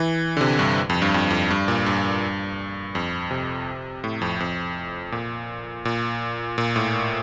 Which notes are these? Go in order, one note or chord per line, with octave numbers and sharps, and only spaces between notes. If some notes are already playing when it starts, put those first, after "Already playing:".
Already playing: E3
D3
C3
G2
F2
G2
F2
F2
G2
A#2
G2
F2
C3
A2
F2
F2
A#2
A#2
A#2
A2